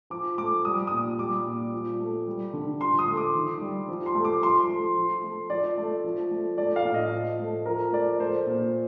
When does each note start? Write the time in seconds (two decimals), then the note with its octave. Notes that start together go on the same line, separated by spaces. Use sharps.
0.10 F3 D6
0.38 A3 D6
0.65 G3 D#6
0.87 A#2 D#6
1.19 G3 D6
1.46 A#2
1.72 F3
2.00 A3
2.27 G3
2.54 D3
2.80 F3 C6
2.99 D#6
3.08 A3
3.17 D6
3.35 D#3
3.61 G3
3.89 F3
4.06 C6
4.15 A3
4.25 D6
4.43 F3 C6
4.69 A3
4.96 F3
5.24 A3
5.50 F3 D5
5.77 A3
6.04 F3
6.31 A3
6.58 A3 D5
6.76 F5
6.85 A2
6.94 D#5
7.12 F3
7.39 A3
7.66 F3 A#4
7.93 A3 D5
8.20 A3 C5
8.47 A#2